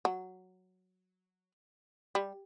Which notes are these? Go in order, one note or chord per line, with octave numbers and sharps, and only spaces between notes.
F#3
G3